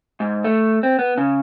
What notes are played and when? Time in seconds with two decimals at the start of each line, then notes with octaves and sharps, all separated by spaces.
0.20 G#2
0.44 A3
0.83 C4
0.99 B3
1.18 C#3